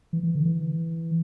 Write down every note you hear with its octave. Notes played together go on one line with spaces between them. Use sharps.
E3
E3
D3
E3